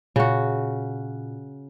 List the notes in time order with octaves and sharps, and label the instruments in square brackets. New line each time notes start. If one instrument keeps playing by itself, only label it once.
[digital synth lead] A#2 [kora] C#3 F#4